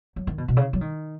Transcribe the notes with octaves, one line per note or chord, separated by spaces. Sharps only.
F#3
D#3
B2
B2
C#3
F#3
D#3